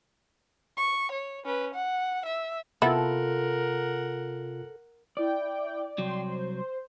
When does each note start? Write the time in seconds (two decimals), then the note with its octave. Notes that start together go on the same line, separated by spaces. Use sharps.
0.77 C#6
1.11 C#5
1.45 C#4 B4
1.74 F#5
2.26 E5
2.82 C3 B3 E4 F4 A4 A#4 F#5
5.17 E4 D5 G5
5.98 C2 F#3 G5 C6
6.23 C5